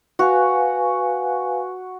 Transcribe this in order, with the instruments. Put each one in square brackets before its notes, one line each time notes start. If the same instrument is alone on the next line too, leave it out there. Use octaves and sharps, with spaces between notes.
[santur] F#4 [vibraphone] B4 F5 G#5